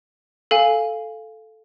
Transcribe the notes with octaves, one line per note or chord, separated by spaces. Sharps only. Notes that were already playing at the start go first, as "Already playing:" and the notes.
A4 F5 G#5